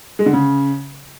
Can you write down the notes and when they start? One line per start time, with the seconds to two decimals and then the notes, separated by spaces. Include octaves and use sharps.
0.19 G#3
0.26 D3
0.33 C#3